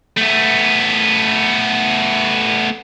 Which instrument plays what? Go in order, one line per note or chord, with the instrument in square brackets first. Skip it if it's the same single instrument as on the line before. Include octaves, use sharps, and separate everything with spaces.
[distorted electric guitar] A3 B3